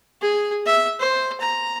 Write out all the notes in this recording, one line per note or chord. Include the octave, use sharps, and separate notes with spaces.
G#4
E5
C5
A#5